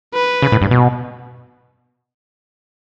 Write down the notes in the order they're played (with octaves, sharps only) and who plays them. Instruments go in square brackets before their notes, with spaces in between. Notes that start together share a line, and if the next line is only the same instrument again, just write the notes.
[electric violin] B4
[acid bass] C#3
A2
G2
B2